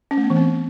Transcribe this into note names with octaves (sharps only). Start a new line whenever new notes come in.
C#4
A3
B3
E3
C4